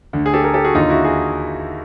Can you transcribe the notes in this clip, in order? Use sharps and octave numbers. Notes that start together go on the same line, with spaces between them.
D2 D3
G#4
G4 A4
G#4 A#4
G4 A4
F#4 G#4
D#2 D3 D#4 F4
E4 F#4
F#4 G#4